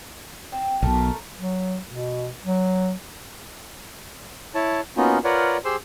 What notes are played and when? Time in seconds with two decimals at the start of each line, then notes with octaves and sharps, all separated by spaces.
0.52 C4
0.83 B1 B2 A3 A#4
1.38 F#3
1.88 B2
2.45 F#3
4.55 E4 C#5 A5
4.97 A#3 B3 C#4 D#4 F4 F#4
5.24 F4 A#4 B4 C#5 D5 F#5
5.65 G4 G#4 C5 C6 E6